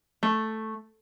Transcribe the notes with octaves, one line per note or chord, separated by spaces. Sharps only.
A3